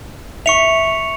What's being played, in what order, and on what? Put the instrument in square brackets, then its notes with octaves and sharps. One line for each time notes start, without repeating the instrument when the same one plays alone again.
[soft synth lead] E5 [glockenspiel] C#6 C#7 F7